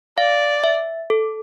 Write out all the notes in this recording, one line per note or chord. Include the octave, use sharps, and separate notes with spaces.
D5 F5
E5
A4